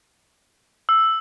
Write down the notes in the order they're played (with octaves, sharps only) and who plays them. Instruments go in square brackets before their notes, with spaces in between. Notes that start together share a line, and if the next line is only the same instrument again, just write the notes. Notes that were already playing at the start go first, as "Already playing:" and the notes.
[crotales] E6